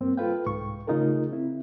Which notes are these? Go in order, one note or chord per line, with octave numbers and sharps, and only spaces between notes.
G2 A#3 C4
F4 A4 B4 F5 G5
C2 G#2 C#6
C#3 A3 D#4 F4 G#4 A#4
C4 E4